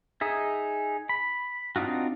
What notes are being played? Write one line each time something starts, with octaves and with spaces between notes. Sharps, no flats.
D#4 G#4 E5
B5
C4 D4 D#4 F4 F#4